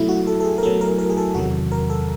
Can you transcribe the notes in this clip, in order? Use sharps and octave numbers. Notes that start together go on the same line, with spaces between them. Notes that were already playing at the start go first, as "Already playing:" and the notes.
Already playing: B2 F#3 A3 E4
F#4
A4
A4
G#4
A#4
B2 F#3 A3 A4
A#4
A#4
G#4
A4
E2 C3 D#3 F#3 F#4
A#4
A4